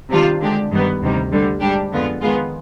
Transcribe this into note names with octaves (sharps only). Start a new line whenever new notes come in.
C3 D#3 G3 D4 F4
D3 G#3 D4 G4
G2 D#3 G3 B3
D2 C3 D#3 G3
D2 D3 G3
G#2 G3 D4 G4
F2 D3 G#3 B3 F4
D#3 G#3 B3 F4 G#4